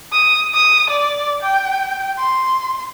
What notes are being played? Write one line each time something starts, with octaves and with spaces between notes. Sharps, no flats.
D#6
D#6
D5
G5
C6